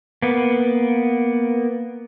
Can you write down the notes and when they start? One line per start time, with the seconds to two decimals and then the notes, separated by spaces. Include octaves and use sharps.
0.22 A#3 B3